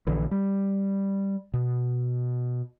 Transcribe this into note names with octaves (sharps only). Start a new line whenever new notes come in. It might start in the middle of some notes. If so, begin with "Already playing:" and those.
A#1 D3 E3
G3
B2